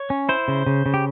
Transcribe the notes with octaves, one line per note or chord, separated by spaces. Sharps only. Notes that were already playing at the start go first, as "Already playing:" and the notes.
Already playing: C#5
C#4
E4 C5
C#3
C#3
C#3
G4